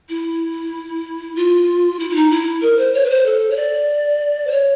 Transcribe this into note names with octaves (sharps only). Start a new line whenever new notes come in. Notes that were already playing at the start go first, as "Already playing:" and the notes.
E4
F4
E4
E4
D#4
E4
A#4
C5
C#5
B4
C5
A4
C#5
D5
C5
C#5